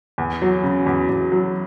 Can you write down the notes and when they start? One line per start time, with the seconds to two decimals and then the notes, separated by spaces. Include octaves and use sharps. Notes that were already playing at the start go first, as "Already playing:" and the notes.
0.18 E2
0.42 F#3
0.63 C#3
0.86 E2
1.09 E2
1.32 F#3